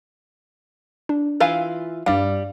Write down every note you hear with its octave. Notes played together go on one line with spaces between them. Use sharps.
D4
E3 F4 F5 G#5 E6
G2 G3 D5 F5